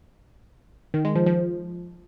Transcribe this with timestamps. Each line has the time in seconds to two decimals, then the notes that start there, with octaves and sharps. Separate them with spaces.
0.94 D#3
1.05 G#3
1.15 F3
1.26 F3